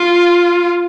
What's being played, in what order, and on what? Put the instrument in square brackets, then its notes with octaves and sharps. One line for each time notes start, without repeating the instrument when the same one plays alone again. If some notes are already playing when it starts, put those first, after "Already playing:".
Already playing: [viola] F4